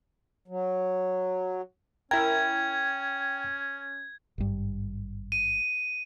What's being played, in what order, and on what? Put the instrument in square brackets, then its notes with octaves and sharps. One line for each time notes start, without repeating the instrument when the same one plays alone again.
[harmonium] F#3
[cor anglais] C#4 [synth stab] E4 A#4 [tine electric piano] G5 [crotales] G#6
[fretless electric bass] G#1 G2
[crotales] D#7